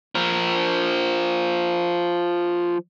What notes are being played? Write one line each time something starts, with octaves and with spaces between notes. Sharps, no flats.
F3 A#4